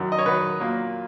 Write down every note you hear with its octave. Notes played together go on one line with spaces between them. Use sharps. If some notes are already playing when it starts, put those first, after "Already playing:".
Already playing: F#2 D#3 F#3
D#5
C#5
F#2 D#3 F#3 B4
A#2 F#3 A#3